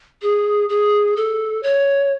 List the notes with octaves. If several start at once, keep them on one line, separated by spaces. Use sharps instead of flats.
G#4
G#4
A4
C#5